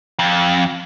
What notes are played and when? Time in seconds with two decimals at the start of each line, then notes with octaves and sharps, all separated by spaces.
0.19 F2